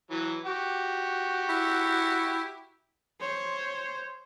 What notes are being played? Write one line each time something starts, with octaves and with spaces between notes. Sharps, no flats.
E3 F#3
F#4 G4
E4
C5 C#5